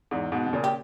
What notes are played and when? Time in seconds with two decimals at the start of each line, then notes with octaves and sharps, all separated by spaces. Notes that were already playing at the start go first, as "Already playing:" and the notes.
0.11 E2 G#2
0.32 G#2 B2
0.46 B2
0.53 A#2 C#3
0.64 G4